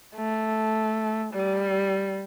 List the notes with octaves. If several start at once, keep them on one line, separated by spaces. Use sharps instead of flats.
A3
G3